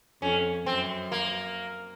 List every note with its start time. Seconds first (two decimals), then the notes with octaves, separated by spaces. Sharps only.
0.22 F2 C#4
0.66 F#2 C4
1.12 A#3